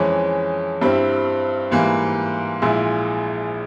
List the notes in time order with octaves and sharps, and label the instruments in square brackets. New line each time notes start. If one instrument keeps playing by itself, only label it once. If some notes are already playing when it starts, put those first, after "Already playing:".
Already playing: [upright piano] F2 E3 G#3 C#4
G2 G3 C4 E4
G#2 E3 G3 A#3
A#1 A#2 G#3 E4